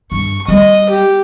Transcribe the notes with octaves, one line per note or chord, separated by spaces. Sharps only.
G2 C#6
G3 D#5
G4